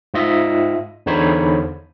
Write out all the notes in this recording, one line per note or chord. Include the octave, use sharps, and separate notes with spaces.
G#2 F4 D#5 E5
E2 D3 D#4 C5 C#5 B5